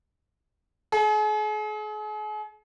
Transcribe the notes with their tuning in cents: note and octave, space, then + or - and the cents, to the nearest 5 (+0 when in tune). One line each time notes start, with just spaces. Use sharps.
G#4 +40